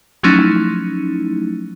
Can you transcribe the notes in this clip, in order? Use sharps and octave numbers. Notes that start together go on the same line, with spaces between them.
F3 F#3 A3 C#4 D#4 E4